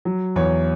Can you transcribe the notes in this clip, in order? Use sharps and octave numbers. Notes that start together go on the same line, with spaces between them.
F#3
E2 C#5